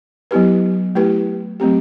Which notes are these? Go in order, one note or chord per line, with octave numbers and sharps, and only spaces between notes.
F#3 B3 E4 G4 B4
A3 E4 G4 B4
F#3 A3 C4 G4